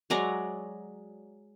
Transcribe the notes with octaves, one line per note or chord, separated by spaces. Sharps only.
F#3 G#3 D5 A#5